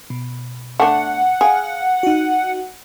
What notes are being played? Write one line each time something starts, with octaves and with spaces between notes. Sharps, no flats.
B2
A3 D4 F#5
G#4 F5
D#4 F#4